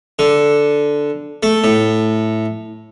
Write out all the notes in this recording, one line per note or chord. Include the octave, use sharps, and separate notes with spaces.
D3
A3
A2